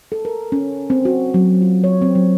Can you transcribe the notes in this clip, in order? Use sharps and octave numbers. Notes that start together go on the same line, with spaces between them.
A4
A#4
C#4
C4
F#4
F#3
F4
C#5
C4
F#3